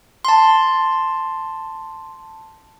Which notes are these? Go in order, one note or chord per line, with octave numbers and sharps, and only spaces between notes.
A5 C6